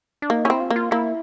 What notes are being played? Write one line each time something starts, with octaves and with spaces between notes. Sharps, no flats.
D4
A#3 D#4
C#4 E4
C4
F4
A#3
F4
A#3 E4